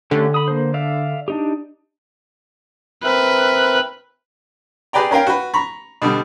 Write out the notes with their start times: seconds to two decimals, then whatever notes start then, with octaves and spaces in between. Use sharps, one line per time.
0.11 D3 A3 C#4 G4
0.34 B5 D#6
0.48 A#3 C5
0.74 D5 E5 F5
1.28 D4 D#4 G4
3.04 C4 A#4 B4 E5
4.93 G4 G#4 B4 D5 G5 A#5
5.11 C#4 A#4 F5 G5
5.27 F#4 B4
5.54 A#5 B5 C#6
6.02 B2 D3 G3